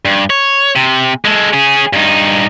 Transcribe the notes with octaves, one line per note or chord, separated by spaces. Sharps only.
G2
C#5
C3
G#3 A4
C#4 G#4
G2 D#4